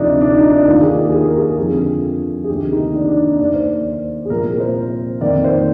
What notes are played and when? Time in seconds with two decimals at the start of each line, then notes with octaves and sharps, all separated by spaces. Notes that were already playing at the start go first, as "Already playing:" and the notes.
Already playing: D2 C3 F3 D4 D#4
0.21 D4
0.36 D#4
0.51 D4
0.67 D#2 D#3 A#3 F4
0.82 G#4
0.97 G#4
1.06 G4
1.12 G#4
1.28 A#4
1.42 G#4
1.58 F2 D3 F3
2.44 G#4
2.48 D2 C3 D#3 A#3 G4
2.71 D#4
2.94 D4
3.08 D4
3.25 D#4
3.39 D#2 D#3 A#3 D5
3.55 C5
4.25 G#4
4.30 C2 A#2 F3 C4 A#4
4.60 C5
5.21 F2 D#3 A#3 D5
5.44 C5